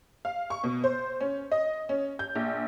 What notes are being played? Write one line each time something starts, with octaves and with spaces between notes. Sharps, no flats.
F5
C#6
B2
C5
C#4
D#5
C#4
G6
A#1